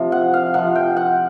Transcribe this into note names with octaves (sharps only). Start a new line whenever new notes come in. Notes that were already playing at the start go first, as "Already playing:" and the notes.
Already playing: C3 F3
F#5
F5
C3 F3 F#5
G5
F#5